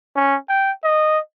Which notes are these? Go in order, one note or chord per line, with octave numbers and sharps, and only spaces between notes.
C#4
G5
D#5